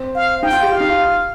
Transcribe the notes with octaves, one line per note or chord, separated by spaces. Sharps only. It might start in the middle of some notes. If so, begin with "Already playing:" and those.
Already playing: C4
F5
D#4 G5
F4
G4
F4 F5
D#4
F4